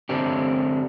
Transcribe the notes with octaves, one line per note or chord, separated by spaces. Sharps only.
D3 C4 D4 G4